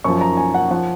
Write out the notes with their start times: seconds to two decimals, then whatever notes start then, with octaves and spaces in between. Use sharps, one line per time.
0.04 F#2 F3 C#6
0.21 A#5
0.37 G#5
0.54 F#5
0.70 F3 F#5